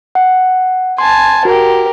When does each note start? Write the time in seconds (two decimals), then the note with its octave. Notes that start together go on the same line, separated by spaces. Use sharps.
0.15 F#5
0.98 G#5 A5 C6
1.45 F#4 G4 A#4